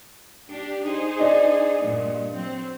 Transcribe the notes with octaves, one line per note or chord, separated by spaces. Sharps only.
D4 G4
D#4 G#4 C5
D4 D#5
G2 A#2
F#3 C4